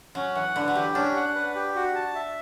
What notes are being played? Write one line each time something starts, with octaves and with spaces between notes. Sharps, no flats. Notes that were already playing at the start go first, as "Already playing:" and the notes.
F#3 C#4
E3 F#5
D3 B4
F#3
E3 G4
C#4 D4
F#5
B4
G4
F#4
A5
E5